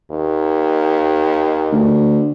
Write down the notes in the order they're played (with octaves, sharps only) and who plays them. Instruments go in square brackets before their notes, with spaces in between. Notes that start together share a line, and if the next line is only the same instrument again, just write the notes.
[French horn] D#2
[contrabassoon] D2